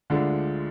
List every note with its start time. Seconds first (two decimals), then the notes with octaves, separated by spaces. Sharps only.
0.10 D2 D3 G#3 D4 F4